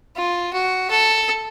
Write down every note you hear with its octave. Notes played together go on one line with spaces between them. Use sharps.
F4
F#4
A4